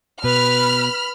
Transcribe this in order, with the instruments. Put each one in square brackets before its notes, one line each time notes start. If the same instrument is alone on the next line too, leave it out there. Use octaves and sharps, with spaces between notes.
[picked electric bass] B2 [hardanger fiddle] B4 [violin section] B5 F6